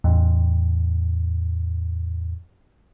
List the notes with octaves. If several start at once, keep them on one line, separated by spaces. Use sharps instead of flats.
E2 A2